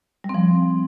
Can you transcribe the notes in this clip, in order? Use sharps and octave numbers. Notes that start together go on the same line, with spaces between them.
G3
C4
F3